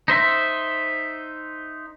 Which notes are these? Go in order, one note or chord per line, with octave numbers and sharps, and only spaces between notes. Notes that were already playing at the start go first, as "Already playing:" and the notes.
D#4 C5 E5